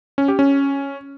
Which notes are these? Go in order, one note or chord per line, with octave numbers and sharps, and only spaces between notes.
C#4
G4
C#4